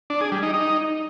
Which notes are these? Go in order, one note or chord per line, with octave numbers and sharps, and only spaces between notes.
D4
G#4
G3
D#4
D#4